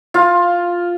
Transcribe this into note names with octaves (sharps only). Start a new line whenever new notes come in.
F4 F5